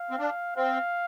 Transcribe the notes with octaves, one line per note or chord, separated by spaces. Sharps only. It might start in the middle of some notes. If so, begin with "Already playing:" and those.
Already playing: F5
C4
D4
C4 F5